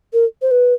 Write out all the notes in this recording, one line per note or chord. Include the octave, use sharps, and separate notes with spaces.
A#4
C5
B4